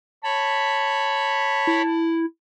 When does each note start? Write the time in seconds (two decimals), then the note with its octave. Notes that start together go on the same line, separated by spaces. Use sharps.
0.24 C#5 A5 B5
1.67 E4